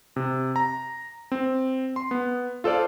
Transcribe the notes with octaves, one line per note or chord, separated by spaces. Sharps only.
C3
A#5
C4
C6
B3
F4 A4 C5 D5 F5